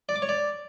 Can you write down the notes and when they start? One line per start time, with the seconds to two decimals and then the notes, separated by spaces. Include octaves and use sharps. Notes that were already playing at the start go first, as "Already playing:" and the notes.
0.09 D5
0.16 D6
0.22 C#5
0.29 D5